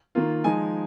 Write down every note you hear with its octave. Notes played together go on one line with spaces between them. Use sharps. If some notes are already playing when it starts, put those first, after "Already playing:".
D#3 A#3 F4
F3 G#3 D#4 G#5